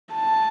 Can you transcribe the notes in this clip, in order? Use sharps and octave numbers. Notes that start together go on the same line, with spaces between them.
A5